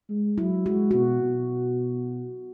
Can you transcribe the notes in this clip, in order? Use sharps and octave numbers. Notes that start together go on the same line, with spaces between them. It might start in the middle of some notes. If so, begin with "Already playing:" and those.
G#3
F#3 E4
G#3 F#4
B2 F#4
B2